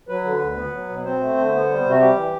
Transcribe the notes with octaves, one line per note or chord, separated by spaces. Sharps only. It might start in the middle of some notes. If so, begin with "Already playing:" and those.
F#3 B4
D3
D2
B3
F#3
B2
C4 C5
A3
D3
B3
G3
C3
F#4
G3 G4
E3